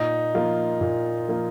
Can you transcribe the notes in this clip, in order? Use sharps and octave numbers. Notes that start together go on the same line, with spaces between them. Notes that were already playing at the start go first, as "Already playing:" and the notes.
Already playing: A#2 D#4
F3 A#3 F4
A#2
F3 A#3 F4